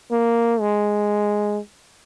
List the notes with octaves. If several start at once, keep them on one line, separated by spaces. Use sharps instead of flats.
A#3
G#3